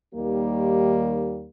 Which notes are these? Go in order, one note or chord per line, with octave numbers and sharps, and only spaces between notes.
D#2 D#3 G3 A#3 G4